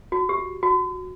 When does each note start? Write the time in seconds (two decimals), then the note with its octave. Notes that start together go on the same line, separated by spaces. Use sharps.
0.12 F#4
0.29 G4
0.63 F#4